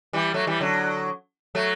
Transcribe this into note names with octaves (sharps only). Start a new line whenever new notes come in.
E3 G3
F#3 A3
E3 G3
D3 F#3
F#3 A3